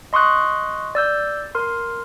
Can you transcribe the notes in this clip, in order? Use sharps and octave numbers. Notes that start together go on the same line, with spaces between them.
D#5 C6 C#6 D#6 F#6
D5 E6 G6
A#4 C6